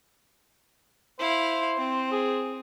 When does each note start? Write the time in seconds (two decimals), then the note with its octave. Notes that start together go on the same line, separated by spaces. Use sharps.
1.19 E4 C5 F5
1.77 C4
2.12 G#4